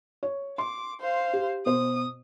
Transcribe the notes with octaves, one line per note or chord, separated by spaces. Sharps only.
C#5
C6 D6
C5 F5
G4
B2 C5 D#6